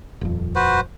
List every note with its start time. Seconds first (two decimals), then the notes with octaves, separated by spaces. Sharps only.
0.21 D#1 F2
0.56 F#4 B4 C5